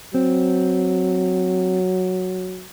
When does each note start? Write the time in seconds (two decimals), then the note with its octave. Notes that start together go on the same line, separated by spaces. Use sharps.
0.14 F#3 C4